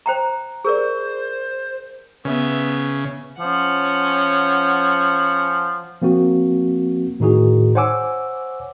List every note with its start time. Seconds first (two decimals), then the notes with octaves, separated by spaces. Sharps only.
0.06 C5 G5 A#5
0.65 G#4 A#4 C5 D5
2.25 C#3 B3 E5
3.40 F3 C#4 F#5
6.02 F3 A#3 C4 F#4
7.20 A2 D#3 D#4 F#4 G#4
7.75 C5 C#5 F#5 G#5 D6 E6